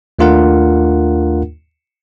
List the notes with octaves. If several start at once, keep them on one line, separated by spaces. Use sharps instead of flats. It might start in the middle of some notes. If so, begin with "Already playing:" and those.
D#2 A3 D4 F4 A#4 F#5